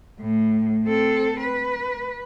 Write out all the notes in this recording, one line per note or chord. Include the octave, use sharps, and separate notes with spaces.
A2
C4 A4
B4